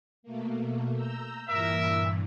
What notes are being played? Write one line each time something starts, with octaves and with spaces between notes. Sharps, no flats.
B2 A3 A#3
A#5 E6 G6
G2 A#2 E3 A#4 E5